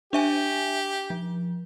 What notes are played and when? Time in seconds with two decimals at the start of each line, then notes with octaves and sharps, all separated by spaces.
0.13 D4 G4 E5 G#5
1.10 F3